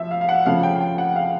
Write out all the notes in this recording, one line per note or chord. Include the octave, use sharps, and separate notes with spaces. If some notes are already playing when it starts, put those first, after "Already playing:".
Already playing: F3 E5
F5
F5
F#5
C#3 F3 A3 F5
G5
G5
F#5
F5